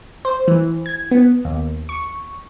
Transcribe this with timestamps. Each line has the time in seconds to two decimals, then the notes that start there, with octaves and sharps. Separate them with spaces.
0.25 C5
0.48 E3
0.86 G#6
1.11 B3
1.45 D#2
1.89 C#6